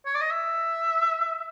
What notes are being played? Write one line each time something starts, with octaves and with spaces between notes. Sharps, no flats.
C#5
D5
D#5
E5